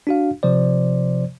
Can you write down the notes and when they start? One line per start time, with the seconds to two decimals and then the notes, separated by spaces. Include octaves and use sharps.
0.07 D4 F#4 F5
0.43 C3 F3 C5 D5